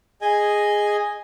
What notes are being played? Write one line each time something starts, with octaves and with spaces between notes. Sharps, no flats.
G#4 D#5 G#5